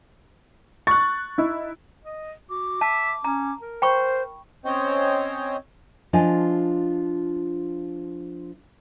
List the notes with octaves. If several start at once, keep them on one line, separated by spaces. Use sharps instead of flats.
C#6 F#6 A6
D#4 E4
D#5
F#4 D6
E5 A5
C#4 A#5
A#4
C5 G5 B5 C#6
C4 C#4 C5 C#5 D#5 G5
F3 D4 F4 D#5 G#5